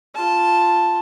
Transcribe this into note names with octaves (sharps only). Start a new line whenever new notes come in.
F4 A5